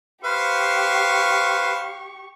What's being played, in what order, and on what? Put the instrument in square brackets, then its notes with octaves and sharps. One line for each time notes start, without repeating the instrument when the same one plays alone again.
[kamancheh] G4 C#6 [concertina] B4 [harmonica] C5 F5